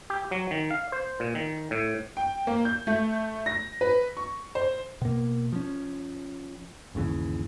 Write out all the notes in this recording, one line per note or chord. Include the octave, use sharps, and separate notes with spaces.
G4
F#3
D#3
F5
C5
A#2
D#3
A2
G5
A#3
G6
A3
A#6
B4
C#6
C5
B2 A#3
F3 C#4
G1 D#2 C#3 E3